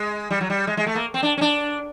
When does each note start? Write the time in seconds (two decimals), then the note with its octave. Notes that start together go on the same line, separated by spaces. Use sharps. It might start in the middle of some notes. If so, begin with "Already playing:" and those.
Already playing: G#3
0.31 G3
0.41 F#3
0.50 G3
0.67 G#3
0.77 G#3
0.87 A3
0.95 A#3
1.14 C4
1.23 D4
1.37 C#4
1.41 D4